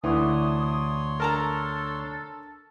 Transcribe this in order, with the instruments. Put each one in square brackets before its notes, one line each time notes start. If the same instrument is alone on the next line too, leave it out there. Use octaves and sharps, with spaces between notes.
[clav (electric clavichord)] D2 [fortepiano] E3 [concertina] C#5 C6 [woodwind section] A5 D6 D#6
[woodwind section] D4 A4 [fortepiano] A#4 A5 A#5